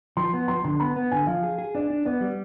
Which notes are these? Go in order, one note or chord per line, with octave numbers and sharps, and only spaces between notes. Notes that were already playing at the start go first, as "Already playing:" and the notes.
F3 C6
B3
F3 C6
D3 C6
B3 B5
B3
D3 G#5
F3 F5
G#4
G#4
D4 D5
D4
B3 D5
G3